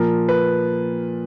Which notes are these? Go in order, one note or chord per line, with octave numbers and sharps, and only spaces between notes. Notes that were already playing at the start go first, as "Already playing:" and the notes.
Already playing: A#2 F3 A#4
B4